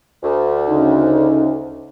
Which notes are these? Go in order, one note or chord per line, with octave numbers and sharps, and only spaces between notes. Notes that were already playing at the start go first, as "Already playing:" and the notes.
D2
C#3 C#4 D#4